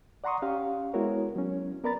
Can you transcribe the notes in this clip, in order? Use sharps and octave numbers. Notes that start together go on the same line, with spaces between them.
D5 F#5 A#5 C6 C#6 D#6
C#4 G4 F5
G#3 B3 E4 F#4 A#4 C#5
F#3 C#4
B3 A#4 D5 A#5 B5 A6